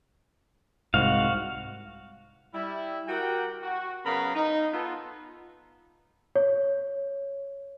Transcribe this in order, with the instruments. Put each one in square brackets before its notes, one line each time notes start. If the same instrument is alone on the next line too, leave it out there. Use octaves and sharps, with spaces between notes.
[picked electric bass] C2 G#2 [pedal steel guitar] F#4 F5
[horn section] G3 E4
F#4 G4 A#4 F#5 G5
F#4
C#3 F#3 B3 A#4 F5 B5
D#4
B3 F4 A4
[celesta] C#5